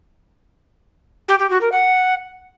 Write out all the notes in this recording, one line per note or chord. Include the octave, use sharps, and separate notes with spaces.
G4
G4
F#4
A#4
F#5